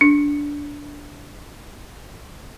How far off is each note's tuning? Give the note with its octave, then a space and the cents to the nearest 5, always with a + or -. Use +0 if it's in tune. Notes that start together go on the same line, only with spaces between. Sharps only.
D4 -15